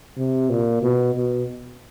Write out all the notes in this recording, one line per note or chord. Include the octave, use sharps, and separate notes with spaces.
C3
A#2
B2
B2